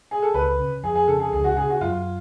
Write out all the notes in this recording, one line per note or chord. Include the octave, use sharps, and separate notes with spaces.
G#4
A4
C#2 B4
C#3
F2 G#4
G#4
C#3 A4
G#4
C#2 G#4
F#4
C#3 G#4
F#4
F#2 F4